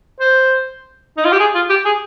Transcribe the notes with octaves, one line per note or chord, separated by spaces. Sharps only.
C5
D#4
F4
G4
G#4
F4
G4
G#4